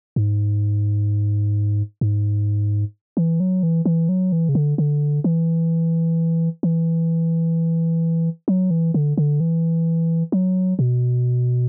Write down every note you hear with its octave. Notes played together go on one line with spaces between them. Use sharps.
G#2
G#2
E3
F#3
E3
E3
F#3
E3
C#3
D3
D3
E3
E3
F#3
E3
D3
D3
E3
F#3
B2